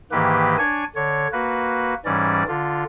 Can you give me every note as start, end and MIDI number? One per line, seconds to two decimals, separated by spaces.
0.12 0.56 44
0.12 0.56 51
0.12 0.56 52
0.12 0.56 58
0.12 0.56 67
0.12 0.56 71
0.58 0.84 62
0.58 0.84 73
0.58 0.84 80
0.95 1.27 50
0.95 1.27 73
1.32 1.94 58
1.32 1.94 66
1.32 1.94 71
2.05 2.43 44
2.05 2.43 52
2.05 2.43 55
2.05 2.43 61
2.05 2.43 74
2.48 2.84 50
2.48 2.84 65